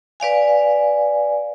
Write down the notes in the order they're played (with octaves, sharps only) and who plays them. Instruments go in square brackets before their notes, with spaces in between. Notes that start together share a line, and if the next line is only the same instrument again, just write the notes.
[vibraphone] B4 D5 F5 G#5